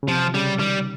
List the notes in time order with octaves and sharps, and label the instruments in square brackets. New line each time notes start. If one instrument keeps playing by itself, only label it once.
[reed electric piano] C#3
[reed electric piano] C3 [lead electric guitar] F3
[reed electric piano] C#3 [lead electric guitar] G3
[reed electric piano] D#3 [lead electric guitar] G3